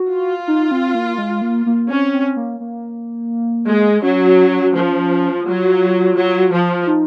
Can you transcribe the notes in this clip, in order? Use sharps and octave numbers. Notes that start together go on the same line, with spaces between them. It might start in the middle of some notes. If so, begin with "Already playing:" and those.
Already playing: F#4
F4
D#4
C4
A#3
G#3
A#3
A#3
C4 C#4
C4
A#3
A#3
G#3
F#3 C#4
F3
F#3 F4
F#3
F3
D#4